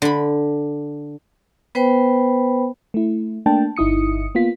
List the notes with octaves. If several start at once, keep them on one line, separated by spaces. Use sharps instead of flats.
D3 B5
B3 B4 C5 G5 B5
A3 E4
A3 A#3 D4 G5 A5
G1 D#4 E4 D#6 C#7
A#3 B3 F4 B6